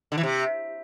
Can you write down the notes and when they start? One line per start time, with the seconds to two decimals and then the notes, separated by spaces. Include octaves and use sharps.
0.12 D3
0.18 E3
0.23 C3